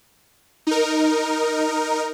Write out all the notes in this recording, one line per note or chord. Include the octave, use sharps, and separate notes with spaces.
D#4 A#4